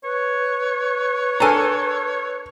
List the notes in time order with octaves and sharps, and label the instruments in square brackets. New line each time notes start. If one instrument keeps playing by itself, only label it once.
[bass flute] B4 [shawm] C#5
[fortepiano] D4 A4 A#4 [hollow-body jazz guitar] G#5 A#5